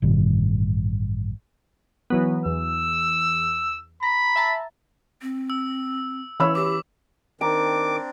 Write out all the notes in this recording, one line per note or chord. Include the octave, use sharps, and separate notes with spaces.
A1 G2 B2 D#3
E3 F#3 B3
E2 E6
A#5 B5
E5 A5 A#5
C4
E6
E3 C#4 C#5 B5 E6
G4 D6
D#3 C4 D4 A#5 D6